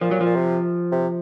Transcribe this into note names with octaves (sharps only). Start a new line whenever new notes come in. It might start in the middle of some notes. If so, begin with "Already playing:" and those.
A#2 F3
F#3
A#2 F3
C3
C3